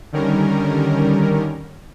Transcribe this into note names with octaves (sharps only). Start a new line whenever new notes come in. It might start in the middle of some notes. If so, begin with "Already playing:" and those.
D3 D#3 G3 C#4 A#4